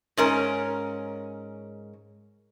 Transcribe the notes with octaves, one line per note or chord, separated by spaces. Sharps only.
G#2 C#4 A#4